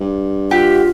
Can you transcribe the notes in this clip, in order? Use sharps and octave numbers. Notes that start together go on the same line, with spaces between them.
G2
F4 G4 E5 F#5